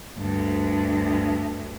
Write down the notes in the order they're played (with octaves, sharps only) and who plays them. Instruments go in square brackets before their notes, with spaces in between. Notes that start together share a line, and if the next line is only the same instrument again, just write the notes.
[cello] D2 G2